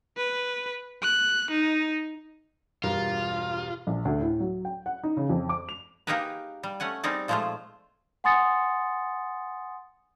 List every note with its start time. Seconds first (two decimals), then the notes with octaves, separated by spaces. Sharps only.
0.17 B4
1.02 F#6
1.51 D#4
2.83 E1 G2 F4 A#4
3.87 A#1
4.05 D2
4.21 A2
4.40 F#3
4.65 G5
4.86 F#5
5.04 D#4
5.17 C#3
5.29 F2
5.49 D6
5.69 F7
6.07 A#3 D#4 G4 G#4 A#4 B4
6.63 G3
6.80 A3 C#4 F#5 G#5
7.03 G3 C4 D#4 G#4 D5
7.28 A#2 F3 G#3 A3 F4 C5
8.24 F#5 G#5 C6 D#6 A6 C#7